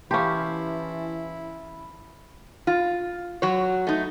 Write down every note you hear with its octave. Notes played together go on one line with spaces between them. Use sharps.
E3 C#4 E4 G4 F5 A5 C6
F4
F#3 C#5
A3 D#4